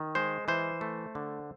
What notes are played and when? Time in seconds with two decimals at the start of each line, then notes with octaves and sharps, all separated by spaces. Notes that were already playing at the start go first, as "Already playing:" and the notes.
Already playing: D#3
0.15 G#3 C5
0.48 E3 C5
0.81 A3
1.15 D3